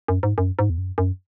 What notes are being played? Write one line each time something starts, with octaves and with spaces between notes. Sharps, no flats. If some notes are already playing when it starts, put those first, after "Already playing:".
F#2
G#2
F#2
G#2
E2
F#2
F#2